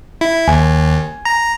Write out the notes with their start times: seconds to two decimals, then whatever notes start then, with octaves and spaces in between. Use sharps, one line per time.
0.21 E4
0.48 D#2 G#5
1.25 A#5